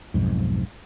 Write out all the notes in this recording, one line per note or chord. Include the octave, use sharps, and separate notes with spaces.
B1 F2 G#2